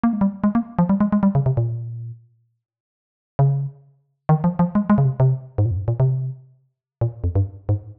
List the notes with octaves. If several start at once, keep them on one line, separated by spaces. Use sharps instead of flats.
A#3
G#3
G3
G#3
A#3
F3
G3
G#3
G#3
G3
C#3
C3
A#2
C#3
D#3
F3
F3
G#3
G#3
C#3
C3
C3
G#2
A#2
F2
G2
A#2
C3
A#2
F2
G2
G#2